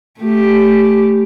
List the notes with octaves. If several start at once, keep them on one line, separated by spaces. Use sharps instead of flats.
A3 G4